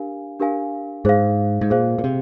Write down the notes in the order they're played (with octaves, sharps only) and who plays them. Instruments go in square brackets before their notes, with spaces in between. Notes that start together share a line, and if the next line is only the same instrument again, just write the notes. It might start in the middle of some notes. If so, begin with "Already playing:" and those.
Already playing: [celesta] D4 G4 A#4 F5 G#5
D4 G4 A#4 F5 G#5
[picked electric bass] G#2 [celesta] G#4 C5 F5
[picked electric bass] G#2
[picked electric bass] A#2 [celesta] G#4 C5 F5
[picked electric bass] A#2
C3